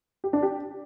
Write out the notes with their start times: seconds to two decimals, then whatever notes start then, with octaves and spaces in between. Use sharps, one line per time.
0.24 G4
0.33 D4
0.43 G4